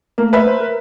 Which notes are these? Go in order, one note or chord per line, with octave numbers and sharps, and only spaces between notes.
A3 A#3
B4 E5
C5
A#4